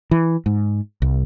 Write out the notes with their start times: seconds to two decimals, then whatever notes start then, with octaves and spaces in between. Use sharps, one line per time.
0.11 E3
0.46 G#2
1.02 C2